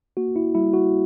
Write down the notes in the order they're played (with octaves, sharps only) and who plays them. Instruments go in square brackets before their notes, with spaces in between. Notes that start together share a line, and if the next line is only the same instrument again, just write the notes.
[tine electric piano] A#3 F#4
E4
G3 E4
F#4